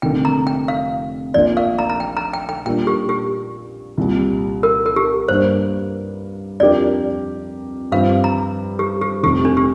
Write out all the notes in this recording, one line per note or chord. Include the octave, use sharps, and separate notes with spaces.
F1 F2 D3 A#3 G5
A#5
G5
F5
A#1 A#2 F3 A#3 F4 D5
F5
A#5
A#5
G5
A#5
G5
G5
A#2 G3 A#3 D4 G5
G4
G4
C2 A#2 G3
A#4
A#4
G4
G2 G3 A#3 D4 C5
F2 F3 D4 G4 A#4 D5
G2 F3 C4 F5
A#5
G4
G4
F1 F2 C3 G4
D4
G4